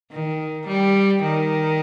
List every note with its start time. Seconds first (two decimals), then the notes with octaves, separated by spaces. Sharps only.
0.12 D#3
0.67 G3
1.23 D#3